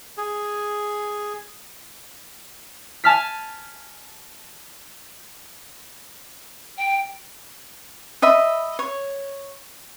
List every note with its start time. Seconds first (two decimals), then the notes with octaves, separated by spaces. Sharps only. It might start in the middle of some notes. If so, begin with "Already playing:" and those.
0.18 G#4
3.04 G#5 A5 F6 B6
6.77 G5
8.22 D#5 E5 B5
8.79 C#5